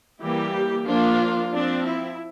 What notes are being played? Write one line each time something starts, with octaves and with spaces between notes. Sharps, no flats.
E3 G3 A#3 G4
F3 A#3 D4 F4
F3 C4 D4
E4